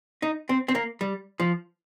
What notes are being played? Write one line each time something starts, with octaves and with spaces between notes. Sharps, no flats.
D#4
C4
C4
A#3
G3
F3